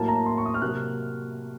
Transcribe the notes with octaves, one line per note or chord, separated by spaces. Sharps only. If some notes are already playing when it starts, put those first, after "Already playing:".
Already playing: A2 F#3 A#3 A5
A#5
C6
C#6
D#6
F6
C3 F#3 A#3 F#6